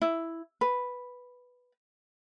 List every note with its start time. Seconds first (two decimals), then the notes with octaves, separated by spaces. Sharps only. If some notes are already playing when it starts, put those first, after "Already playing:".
0.02 E4
0.61 B4